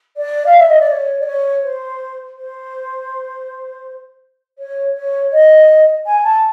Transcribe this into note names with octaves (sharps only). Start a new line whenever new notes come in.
D5
F5
E5
D#5
D5
C#5
D5
C#5
C5
C5
C#5
C#5
D#5
G#5
A5